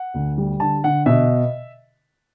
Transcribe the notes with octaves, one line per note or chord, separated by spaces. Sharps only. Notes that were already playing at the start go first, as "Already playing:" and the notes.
Already playing: F#5
D2
G3
D3 A5
D3 F#5
B2 E5